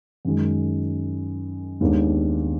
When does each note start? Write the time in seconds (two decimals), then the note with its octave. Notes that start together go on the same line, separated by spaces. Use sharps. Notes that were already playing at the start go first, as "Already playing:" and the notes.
0.25 F#2 D#3 G#3
1.81 D#2 D#3 G#3 B3 D4